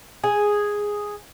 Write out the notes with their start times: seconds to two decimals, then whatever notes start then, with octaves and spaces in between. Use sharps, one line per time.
0.24 G#4